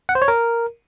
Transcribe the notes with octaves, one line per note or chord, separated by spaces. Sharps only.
F#5
C5
C#5
A#4